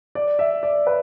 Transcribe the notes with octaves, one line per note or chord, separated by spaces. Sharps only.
D5
E5
D5
B4